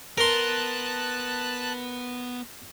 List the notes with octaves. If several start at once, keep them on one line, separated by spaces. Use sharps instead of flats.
B3 A#4 A5 C6 F#6